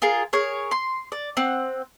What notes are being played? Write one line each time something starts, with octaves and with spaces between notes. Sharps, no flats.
F4 G#4 A#4
G#4 A#4 C#5
C6
D5
C4 F#5